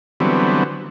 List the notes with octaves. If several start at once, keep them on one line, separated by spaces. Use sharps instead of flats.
D3 E3 F#3 G3 B3 C4